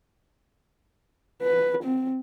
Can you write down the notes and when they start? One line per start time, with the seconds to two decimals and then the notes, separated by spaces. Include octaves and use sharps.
1.42 B4
1.84 C4